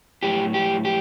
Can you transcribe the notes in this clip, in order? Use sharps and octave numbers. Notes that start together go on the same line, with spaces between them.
A2 F#3 G4
G4
G4